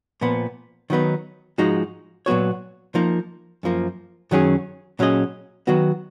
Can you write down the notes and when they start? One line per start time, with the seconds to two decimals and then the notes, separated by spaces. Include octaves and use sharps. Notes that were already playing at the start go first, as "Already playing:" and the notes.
0.21 A#2 F3 B3
0.90 D#3 F#3 B3 D#4
1.58 G#2 F3 G#3 D#4 F#4
2.26 A#2 F#3 B3 F#4 C#5
2.95 F3 A#3 D#4
3.63 F#2 F3 A#3
4.31 F#2 D#3 F#3 C#4 G#4
4.99 A#2 F#3 C#4 G#4 D#5
5.67 D#3 F#3 B3 F#4